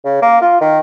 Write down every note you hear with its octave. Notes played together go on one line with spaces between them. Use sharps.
C#3
A#3
F4
D#3